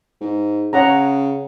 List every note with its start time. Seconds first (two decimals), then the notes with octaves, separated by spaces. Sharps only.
0.21 G#2
0.73 C#3 C#5 F#5 A#5